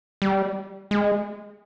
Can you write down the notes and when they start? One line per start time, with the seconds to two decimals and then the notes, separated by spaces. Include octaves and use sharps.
0.22 G3
0.91 G#3